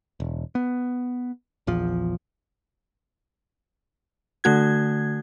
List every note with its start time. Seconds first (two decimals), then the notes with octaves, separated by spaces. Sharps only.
0.20 E1
0.55 B3
1.67 A#1 E2 F3
4.44 D3 A3 F#4 G#6